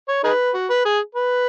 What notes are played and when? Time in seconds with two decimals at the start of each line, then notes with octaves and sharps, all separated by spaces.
0.09 C#5
0.24 D#4 G#4 B4
0.54 F#4
0.70 B4
0.85 G#4
1.15 B4